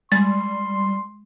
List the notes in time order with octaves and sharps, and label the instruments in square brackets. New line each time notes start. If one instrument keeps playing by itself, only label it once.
[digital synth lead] G3 [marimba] G#3 A6 [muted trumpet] C6